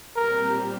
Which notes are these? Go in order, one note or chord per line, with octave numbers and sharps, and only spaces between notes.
A#2 G3 C4 G4 A#4